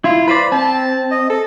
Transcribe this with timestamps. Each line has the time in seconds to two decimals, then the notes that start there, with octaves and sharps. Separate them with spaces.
0.04 E4 F4
0.28 B4 C5 D5 B5
0.52 C4 A5
1.11 D#5
1.30 A4